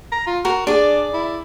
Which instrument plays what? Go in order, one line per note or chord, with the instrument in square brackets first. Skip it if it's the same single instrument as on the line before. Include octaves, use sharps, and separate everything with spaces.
[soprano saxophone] A#5
F4
[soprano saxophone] F#4 [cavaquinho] A#4
[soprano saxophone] D4 [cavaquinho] G#4 D5
[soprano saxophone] E4